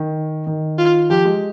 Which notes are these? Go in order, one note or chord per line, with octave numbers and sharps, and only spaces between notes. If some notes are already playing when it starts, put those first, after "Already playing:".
Already playing: D#3
D#3
F4
F3 G4
G#3